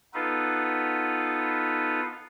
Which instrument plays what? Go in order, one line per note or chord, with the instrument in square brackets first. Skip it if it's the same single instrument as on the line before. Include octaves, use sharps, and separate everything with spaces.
[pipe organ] B3 D#4 F4 A4 B4